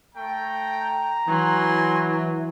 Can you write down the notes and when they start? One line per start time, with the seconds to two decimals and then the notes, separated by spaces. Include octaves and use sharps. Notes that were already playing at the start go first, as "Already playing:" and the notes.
0.15 A3 G5 A#5
1.28 E3 F#3 E4 G#5 C6